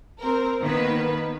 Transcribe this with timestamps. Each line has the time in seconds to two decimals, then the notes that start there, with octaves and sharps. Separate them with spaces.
0.21 C4 A#4
0.61 D#3 A#3 B3 B4